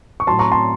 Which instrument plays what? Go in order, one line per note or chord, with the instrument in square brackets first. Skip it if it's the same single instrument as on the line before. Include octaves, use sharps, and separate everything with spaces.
[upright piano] C#6
A2 F#3 A5 C6
A#5 C#6
A5 C6